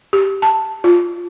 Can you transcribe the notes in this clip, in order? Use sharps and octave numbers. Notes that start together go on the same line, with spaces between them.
G4
A5
F4